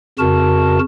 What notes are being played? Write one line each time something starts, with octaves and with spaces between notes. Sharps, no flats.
F2 C#3 F#4 A#4 A5